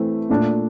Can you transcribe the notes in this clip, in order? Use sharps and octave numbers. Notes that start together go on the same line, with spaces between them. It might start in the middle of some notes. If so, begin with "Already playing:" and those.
Already playing: E3 A3 C4
A#2 A3 D4